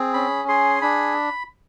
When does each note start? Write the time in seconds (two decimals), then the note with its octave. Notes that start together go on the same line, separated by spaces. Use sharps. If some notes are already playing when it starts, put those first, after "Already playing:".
Already playing: C4 G#4
0.14 C#4 B5
0.48 G#4 C6
0.82 D4 B5